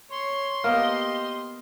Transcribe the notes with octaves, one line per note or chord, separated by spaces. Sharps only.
C#5 C6
A#3 B3 G4 D#5 F6